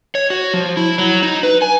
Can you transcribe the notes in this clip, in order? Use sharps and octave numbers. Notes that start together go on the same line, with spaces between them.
C#5
F#4
F3
E4
F#3
D#4
B4
G#5